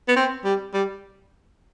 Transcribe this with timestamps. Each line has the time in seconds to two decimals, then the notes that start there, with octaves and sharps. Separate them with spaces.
0.08 B3
0.16 C4
0.45 G3
0.74 G3